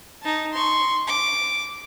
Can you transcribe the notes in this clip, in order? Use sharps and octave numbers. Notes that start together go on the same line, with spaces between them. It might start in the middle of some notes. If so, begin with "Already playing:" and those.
D#4 A5
C6 C#6
D6